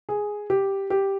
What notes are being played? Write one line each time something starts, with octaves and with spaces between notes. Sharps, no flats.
G#4
G4
G4